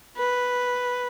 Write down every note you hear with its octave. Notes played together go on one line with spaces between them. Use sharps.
B4